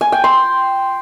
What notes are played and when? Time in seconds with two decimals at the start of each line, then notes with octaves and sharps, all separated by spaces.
0.01 G#5
0.12 G5
0.24 C6